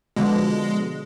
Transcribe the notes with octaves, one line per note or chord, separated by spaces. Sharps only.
B2 D3 F3 G#3